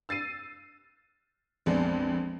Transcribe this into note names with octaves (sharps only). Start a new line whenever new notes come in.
E6 A6 C7 D#7
A#1 F2 G#3 B3 D5